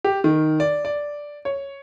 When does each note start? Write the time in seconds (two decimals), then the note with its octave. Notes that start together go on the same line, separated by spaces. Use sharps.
0.04 G4
0.24 D#3
0.60 D5
0.85 D5
1.45 C#5